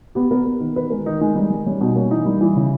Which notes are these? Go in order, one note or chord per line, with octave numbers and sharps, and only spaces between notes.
B3 G4
B3 A#4
B3
D#3
D#3 B4
G#3 A#4
D#3 D#4
G#3 D#4
G3 D#4
G3
G3 C#4
B2 D#4
A#3 C#4
E3 D#4
G3
E3
C#3